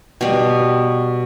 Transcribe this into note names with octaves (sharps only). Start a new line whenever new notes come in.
B2 G3